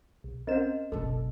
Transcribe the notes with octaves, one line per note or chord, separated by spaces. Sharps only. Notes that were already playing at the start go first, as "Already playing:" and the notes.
B1
C4 C#4 A#4 C5 D#5 F#5 E7
F#1 B1 A4